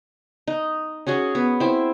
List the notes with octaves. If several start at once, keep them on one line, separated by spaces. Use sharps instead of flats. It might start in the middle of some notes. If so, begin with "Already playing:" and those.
D#4
C#4 F#4 G#4 C#5
B3
C4 E4